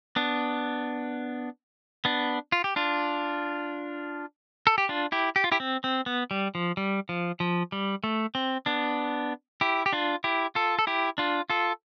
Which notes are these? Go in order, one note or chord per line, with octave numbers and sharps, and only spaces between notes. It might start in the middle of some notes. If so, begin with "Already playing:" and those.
B3 D4
B3 D4
F4
G4
D4 F4
A4
G4
D4 F4
E4 G4
G4
F4
E4 G4
C4
C4
B3
G3
F3
G3
F3
F3
G3
A3
C4
B3 D4
E4 G4
G4
D4 F4
E4 G4
F4 A4
A4
E4 G4
D4 F4
F4 A4